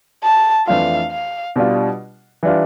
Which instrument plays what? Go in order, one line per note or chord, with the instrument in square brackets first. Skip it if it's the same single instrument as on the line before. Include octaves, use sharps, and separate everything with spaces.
[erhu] A5
[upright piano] F2 E3 A3 D4 F4 [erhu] F5
[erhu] F5
[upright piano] B2 G3 D4 F4
E3 G3 D4 F4